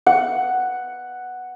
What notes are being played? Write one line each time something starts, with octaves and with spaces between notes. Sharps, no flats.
F#5